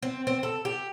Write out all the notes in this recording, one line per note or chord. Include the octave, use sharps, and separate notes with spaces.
C4
C4
A4
G4